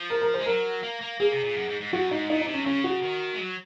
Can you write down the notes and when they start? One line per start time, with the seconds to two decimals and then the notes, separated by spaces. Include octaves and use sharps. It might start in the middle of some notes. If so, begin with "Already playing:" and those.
Already playing: F3
0.10 A#4
0.21 A#4
0.34 C5
0.39 G#3
0.46 F#3 A#4
0.83 A#3
1.01 A#3
1.20 A#3 G#4
1.32 C3
1.44 A#2
1.56 F#2
1.69 G#2
1.80 G#2
1.93 F#2 F#4
2.11 G#2 D#4
2.29 A#2 D#4
2.42 D#4
2.48 C3
2.54 C#4
2.66 C#3 C#4
2.84 F#4
3.03 D#3
3.34 G#3
3.39 F#3